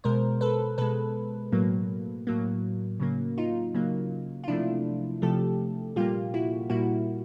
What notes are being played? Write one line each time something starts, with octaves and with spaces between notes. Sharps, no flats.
B2 G#3 A#4 C5
A4 B4
B2 G#3 A4 B4
A2 F#3 A#3
A2 F#3 A#3
C#3 F#3 A#3
D#4 F4
C#3 F#3 A#3
F4
C3 F3 A3 D4 E4
C3 F3 A3 G4 A4
A#2 G3 A#3 F4 G4
E4 F#4
A#2 G3 A#3 E4 F#4